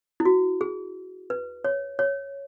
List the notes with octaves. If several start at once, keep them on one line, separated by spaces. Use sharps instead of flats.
E4
F#4
G#4
B4
C#5
C#5